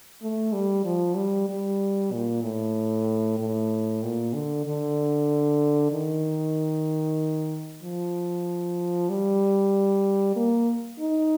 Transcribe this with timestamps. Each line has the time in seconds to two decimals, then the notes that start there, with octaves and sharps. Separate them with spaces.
0.22 A3
0.53 G3
0.85 F3
1.16 G3
1.49 G3
2.12 A#2
2.43 A2
3.39 A2
4.03 A#2
4.34 D3
4.66 D3
5.92 D#3
7.83 F3
9.09 G3
10.36 A#3
10.99 D#4